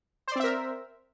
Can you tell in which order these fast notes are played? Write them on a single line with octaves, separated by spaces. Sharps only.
C5 D5 C4 E5 A#4